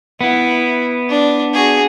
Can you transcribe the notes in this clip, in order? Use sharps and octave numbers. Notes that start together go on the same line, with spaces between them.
B3 E4
D4
F#4 G#4